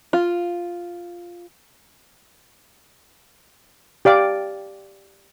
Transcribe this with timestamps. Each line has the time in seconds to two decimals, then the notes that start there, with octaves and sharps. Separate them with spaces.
0.13 F4
4.05 G4 D5 F5 D6